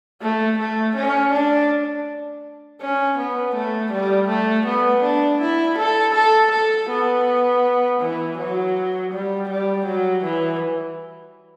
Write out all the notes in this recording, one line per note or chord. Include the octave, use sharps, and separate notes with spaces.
A3
A3
C#4
D4
C#4
B3
A3
G3
A3
B3
D4
E4
A4
A4
A4
B3
E3
F#3
G3
G3
F#3
E3